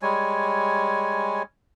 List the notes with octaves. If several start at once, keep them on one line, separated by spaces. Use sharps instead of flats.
G3 G#3 C#5 G#5